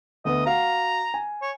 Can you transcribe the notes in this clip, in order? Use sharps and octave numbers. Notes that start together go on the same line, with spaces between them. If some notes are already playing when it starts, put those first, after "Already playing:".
D2 A3 B3 D#5
F#4 F5 A#5
G#5
C#5